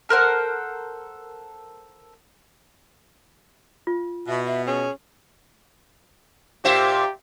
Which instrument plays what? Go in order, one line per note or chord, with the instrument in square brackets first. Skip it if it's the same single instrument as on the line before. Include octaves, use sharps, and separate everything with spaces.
[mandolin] A4 A#4 C5 F#5
[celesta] F4
[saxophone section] B2 [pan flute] E5
[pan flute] E5
[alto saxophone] C#4 [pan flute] G#4
[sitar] A#2 C5 E5 [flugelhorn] G4